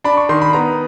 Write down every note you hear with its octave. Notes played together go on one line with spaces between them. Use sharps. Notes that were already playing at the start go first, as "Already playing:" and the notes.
D4 B5
C#6
D#3 C6
B5
B3 A#5